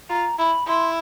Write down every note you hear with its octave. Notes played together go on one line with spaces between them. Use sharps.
F4 A#5
E4 B5
E4 C6